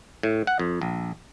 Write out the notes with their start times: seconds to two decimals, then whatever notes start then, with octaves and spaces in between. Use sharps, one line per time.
0.23 A2
0.47 F#5
0.59 F2
0.82 A#1